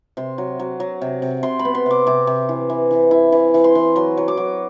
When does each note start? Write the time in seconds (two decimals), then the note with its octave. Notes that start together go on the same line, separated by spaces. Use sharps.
0.17 C3 C6
0.38 F#3
0.59 F#3
0.80 F#3
1.01 C3
1.22 C3
1.43 C3 C6
1.59 B5
1.65 B3
1.75 C6
1.86 C3 D6
2.07 C3 D6
2.27 C3
2.49 E3
2.70 E3
2.91 E3
3.11 E4
3.32 E3
3.54 E3
3.64 C6
3.75 E3
3.96 F#3 C6
4.17 F#3
4.28 D6
4.37 F#3